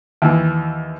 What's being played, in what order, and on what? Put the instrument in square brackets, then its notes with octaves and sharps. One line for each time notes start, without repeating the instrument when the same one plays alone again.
[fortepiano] D#2 E3